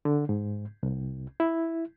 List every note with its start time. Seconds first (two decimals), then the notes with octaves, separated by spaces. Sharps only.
0.05 D3
0.29 G#2
0.83 C2
1.40 E4